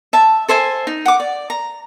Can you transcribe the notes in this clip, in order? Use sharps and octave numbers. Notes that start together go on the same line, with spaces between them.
E5 A5
A4 C5 E5 G#5
D#4
F#5 D6
D5
A#5